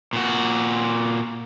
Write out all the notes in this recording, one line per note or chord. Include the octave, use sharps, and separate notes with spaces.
A#2 F#4